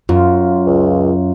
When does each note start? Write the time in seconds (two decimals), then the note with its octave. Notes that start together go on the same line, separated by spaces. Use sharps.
0.09 F#2 F4
0.66 C#2